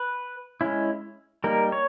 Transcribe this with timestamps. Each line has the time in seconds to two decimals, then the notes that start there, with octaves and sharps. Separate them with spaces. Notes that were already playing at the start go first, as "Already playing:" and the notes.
Already playing: B4
0.61 G#3 C#4 E4
1.44 G3 A#3 D#4 A#4
1.72 C#5